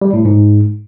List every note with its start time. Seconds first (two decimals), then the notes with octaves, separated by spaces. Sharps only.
0.02 G3
0.13 A2
0.25 G#2